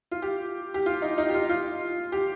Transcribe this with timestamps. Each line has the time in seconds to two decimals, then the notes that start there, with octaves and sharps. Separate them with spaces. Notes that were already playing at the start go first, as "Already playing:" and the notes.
0.11 F4
0.22 G4
0.74 G4
0.86 F4
1.02 D#4
1.18 D#4
1.29 G4
1.34 F4
1.49 F4
2.12 G4